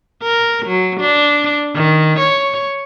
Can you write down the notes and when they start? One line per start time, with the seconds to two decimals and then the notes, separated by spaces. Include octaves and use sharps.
0.23 A#4
0.66 F#3
1.00 D4
1.75 D#3
2.19 C#5